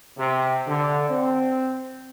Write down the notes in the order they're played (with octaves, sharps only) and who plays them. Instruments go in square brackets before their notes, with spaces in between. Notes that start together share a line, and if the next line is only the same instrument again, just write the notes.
[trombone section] C3
D3
C4